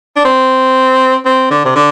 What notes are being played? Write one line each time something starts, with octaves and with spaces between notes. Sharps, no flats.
D4
C4
C4
D3
C3
D3